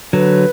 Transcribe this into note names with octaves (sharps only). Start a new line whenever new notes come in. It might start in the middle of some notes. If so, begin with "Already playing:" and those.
D3 F#3 B4